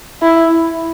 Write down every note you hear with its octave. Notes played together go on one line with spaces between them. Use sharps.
E4